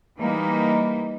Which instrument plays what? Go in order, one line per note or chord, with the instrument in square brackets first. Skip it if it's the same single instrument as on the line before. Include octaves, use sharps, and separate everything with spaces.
[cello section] E3 G3 A#3 D#4